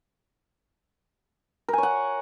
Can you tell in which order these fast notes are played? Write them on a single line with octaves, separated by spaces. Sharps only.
A#4 G#5 C#5 F#5